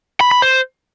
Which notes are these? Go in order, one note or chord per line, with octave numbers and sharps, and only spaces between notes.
B5
B5
C5